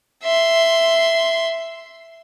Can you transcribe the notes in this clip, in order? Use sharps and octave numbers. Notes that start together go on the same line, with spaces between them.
E5 C6